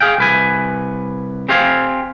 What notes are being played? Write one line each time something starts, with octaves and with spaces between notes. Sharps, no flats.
G#4 F5 G5
C2 B4 G#5
C4 G4 C5 F5 F#5 G#5